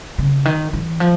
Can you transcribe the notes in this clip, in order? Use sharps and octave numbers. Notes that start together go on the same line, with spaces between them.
C#3
D#3
E3
F3